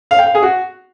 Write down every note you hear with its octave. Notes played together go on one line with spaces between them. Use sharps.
F5
G5
F5
G#4
F#4